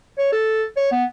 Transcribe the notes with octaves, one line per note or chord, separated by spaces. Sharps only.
C#5
A4
C#5
B3